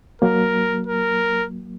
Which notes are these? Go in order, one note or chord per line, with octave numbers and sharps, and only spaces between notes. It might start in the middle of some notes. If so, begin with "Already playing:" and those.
F#3 A#3 A#4
A#4